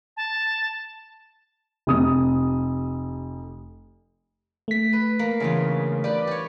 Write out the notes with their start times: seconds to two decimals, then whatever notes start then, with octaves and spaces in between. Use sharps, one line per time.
0.17 A5
1.87 F1 C3 D#6
4.68 A3 B6
4.93 B4
5.19 A#3
5.40 E2 G2 C#3 F4
6.04 G4 B4 D5
6.27 G4 C#5